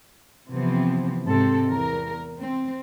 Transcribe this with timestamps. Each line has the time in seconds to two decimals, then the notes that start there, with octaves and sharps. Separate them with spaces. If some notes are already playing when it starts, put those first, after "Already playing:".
0.51 C3 E3 F3 B3 C4
1.26 G#2 C3 C4 A4
1.70 E2 A#4
2.38 C4